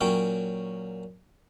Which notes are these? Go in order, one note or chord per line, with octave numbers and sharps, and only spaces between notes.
A#2 F#3 C#4 G5